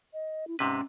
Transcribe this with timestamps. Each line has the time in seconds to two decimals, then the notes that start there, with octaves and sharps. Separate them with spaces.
0.13 D#5
0.47 E4
0.59 G#2 C3 C#4 B4